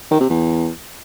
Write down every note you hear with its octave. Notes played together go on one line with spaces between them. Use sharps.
D#3
C3
E2